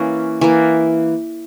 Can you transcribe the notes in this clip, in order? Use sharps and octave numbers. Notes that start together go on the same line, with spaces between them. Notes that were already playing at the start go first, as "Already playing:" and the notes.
Already playing: E3 A#3 C#4
E3 A#3